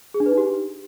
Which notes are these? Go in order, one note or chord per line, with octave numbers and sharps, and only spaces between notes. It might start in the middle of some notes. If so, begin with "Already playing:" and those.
G#4
D4
B4
D#4
G4